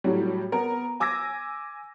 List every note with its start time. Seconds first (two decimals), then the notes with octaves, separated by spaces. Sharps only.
0.04 A2 F#3 G3
0.52 B3 A#4
1.00 G#5 D6 E6 G#6 A#6